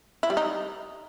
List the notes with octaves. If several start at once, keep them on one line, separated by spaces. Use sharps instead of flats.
E4
G3
D#4